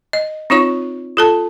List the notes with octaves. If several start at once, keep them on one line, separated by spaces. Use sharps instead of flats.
D#5
C4 D#4 F4 C#5 C#6
F4 A4 A5